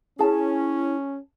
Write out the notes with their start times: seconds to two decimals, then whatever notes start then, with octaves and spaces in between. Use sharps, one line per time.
0.19 C#4 E4 G#4 A5